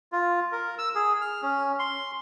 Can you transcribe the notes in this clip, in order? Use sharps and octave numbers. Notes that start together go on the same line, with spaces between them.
F4
A#4
E6
G#4
F6
C#4
C6